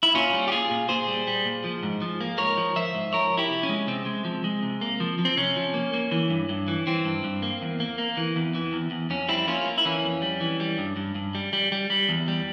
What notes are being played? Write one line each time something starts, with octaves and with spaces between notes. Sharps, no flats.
E4
A#2 C#4 F4
G3
G4
A#2 F4 G#4
A#2
A#2 G#4 C5
G3
G3
A#2
F3
G#2
F3
A#3
G#2 A#4 C#5
F3
F3 C5 E5
G#2
F3 A#4 C#5
F3
E4 G4
C3
C#4
G#3
C3 C4
G#3
F3
G#3
C3
A#3
F3
F3
C4
C3 C#4
F3
A#3
A#3
E3
G2
G2
E3
E3 C4
G2
G2
A#3
E2
A#3
A#3
E3
E2
E3
E2
E2
F2 C#4
G3 C4 E4
A#3 C#4 F4
A#3
E4
E3 C#4
F2
G3
E3
G3
G2
G2
G2
G3
G3
G3
G3
E2
G3